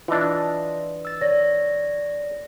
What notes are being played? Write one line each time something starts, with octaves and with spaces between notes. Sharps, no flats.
E3 D4 F4 D#5
E6 A6
C#5 D5 A#6